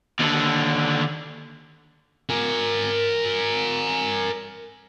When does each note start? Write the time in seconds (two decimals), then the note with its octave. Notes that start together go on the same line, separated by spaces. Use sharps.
0.20 D#2 D3
2.30 A#4 G#5